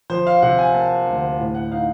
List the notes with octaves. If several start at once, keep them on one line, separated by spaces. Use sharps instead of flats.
F3 C5
F5
C3 F#5
G#5
A#3 A5
D2
A2
F#5
D#4 F5